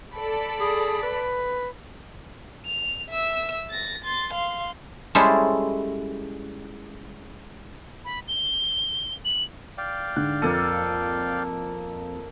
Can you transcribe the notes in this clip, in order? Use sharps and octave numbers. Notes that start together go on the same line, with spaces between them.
A4 D5 B5
G#4
B4
F7
E5 E6
A6 A#6
C6 A6
F5 C6
G3 G#3 C#4 E4 A4 C5
B5
G7
F#7
D5 F5 G5
G#2 D3 F#6
F2 A#3 A4 D#7